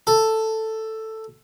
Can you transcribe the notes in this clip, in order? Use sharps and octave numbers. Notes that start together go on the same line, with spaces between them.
A4